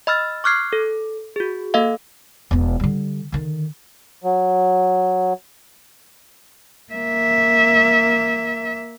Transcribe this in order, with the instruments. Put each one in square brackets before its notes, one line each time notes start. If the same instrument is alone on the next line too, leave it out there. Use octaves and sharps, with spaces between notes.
[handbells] D#5 B5 E6 F6 A6
C#6 D6 F6 F#6 G#6 C7
A4
F#4 G#4
A#3 A4 D#5 F5
[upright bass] E1 B3
D3 G3
D3 D#3
[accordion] F#3
[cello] A#3 E5